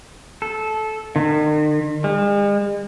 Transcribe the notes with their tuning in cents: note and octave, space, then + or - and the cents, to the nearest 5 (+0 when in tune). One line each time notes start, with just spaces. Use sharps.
A4 -15
D#3 -45
G#3 -45